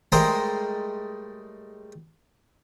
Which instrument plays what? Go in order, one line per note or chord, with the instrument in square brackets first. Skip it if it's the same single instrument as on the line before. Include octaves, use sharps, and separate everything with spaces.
[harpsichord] A2 G3 G#3 A#4 C5 D#5